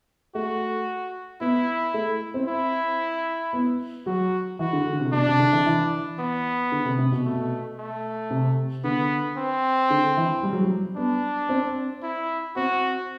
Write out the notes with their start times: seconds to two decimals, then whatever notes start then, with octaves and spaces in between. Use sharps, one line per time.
0.35 A3 F#4
1.41 B3 E4
1.94 A3
2.34 C4
2.48 E4
3.53 B3
4.06 F#3 F#4
4.59 E3 F#4
4.73 D3
4.93 D3
5.00 C3
5.12 B2 D4
5.26 C3
5.39 D3
5.52 E3
5.66 E3
6.19 B3
6.72 D3
6.85 C3
6.99 C3
7.12 B2
7.25 A3
7.78 A3
8.30 C3
8.84 D3 B3
9.37 C4
9.90 D3
10.17 E3
10.43 G3
10.53 F#3
10.63 G3
10.96 B3 D4
11.49 C4
12.03 E4
12.56 C4 F#4